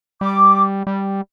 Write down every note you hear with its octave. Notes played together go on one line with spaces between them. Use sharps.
G3 D6
G3